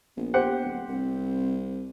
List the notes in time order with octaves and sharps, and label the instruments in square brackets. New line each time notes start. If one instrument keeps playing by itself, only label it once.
[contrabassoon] A#1 [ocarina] B3
[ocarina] B3 [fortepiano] G4 C5 F#5
[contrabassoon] D1
[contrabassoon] C2 [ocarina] C4